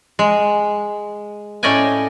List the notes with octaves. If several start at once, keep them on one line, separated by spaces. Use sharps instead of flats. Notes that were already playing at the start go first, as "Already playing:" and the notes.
G#3
A2 C#4 D5 D#5 G5 G#5